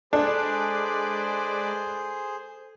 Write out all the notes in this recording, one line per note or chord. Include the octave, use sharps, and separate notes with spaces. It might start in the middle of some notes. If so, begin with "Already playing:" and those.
G#3 D4 G#4 A4 B4 C5 D5